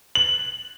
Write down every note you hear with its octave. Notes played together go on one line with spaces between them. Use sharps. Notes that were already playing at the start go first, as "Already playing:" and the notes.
F#7